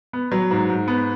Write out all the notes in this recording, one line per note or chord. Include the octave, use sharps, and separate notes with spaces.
B3
F#3
G#2
G#2
B3